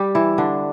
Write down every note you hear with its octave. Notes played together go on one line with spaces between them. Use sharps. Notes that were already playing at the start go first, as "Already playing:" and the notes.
Already playing: G3 G4
E3 E4
D3 D4